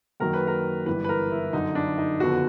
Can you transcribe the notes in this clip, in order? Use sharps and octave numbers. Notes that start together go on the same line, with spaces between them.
F#2 D#3 F#3 A#3 A#4
B4
A#4
G1 G2 E3 B4
B4
A#4
E4
G1 F#2 D3 D#4
D4
D#4
F#1 F2 D3 F#3 B3 F#4